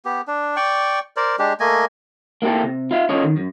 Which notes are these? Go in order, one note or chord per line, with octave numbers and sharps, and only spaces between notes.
B3 G4
D4
D5 G5 C#6
A#4 C5 D5
G#3 D4 G4
A3 A#3 D#5 G#5
A#3 E4 F4 G4 A4
C3
F4 E5 F5
C#4 F4 A4 C#5 D#5
D#3
F#2